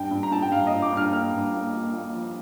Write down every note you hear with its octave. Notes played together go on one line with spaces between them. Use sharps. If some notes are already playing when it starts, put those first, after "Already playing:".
Already playing: G2 G5
G2
A#5
G2 A5
G5
G2 F5
G2 D#5
D6
G2 F6
A#3 F6
G2
A#3
A#3
A#3
F3